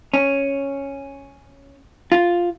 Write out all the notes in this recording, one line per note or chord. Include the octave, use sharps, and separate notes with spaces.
C#4
F4